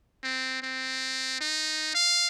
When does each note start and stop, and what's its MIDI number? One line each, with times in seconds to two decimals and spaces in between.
0.23 0.62 60
0.62 1.38 60
1.40 1.92 63
1.94 2.27 77